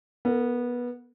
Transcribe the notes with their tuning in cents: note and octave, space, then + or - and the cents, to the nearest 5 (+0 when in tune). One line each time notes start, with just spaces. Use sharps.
B3 -20 A#4 -45